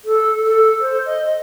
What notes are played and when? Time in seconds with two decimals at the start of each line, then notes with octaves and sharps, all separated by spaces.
0.05 A4
0.43 A4
0.81 C5
1.06 D#5
1.26 D#5